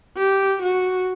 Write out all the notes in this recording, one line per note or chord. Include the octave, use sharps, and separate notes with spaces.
G4
F#4